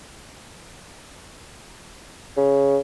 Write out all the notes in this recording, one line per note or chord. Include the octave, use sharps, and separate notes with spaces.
C#3